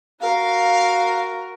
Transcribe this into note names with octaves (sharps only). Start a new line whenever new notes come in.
F#4 A#4 F5